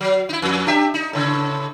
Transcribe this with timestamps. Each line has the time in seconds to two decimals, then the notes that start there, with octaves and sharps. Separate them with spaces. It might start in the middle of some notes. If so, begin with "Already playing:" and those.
0.01 F#3
0.29 D#4 E4
0.42 F2
0.66 D4 G4 E5
0.94 D#4
1.13 A2 C#3